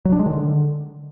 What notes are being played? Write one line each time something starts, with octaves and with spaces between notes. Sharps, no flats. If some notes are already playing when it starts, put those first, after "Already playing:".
F#3
D4
G#3
D#3
D3